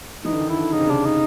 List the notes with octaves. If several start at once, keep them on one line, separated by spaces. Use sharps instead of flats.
E3 D#4
D3
D#3
E4
D3
C#3 D#4
C3
C#3 D4
D#4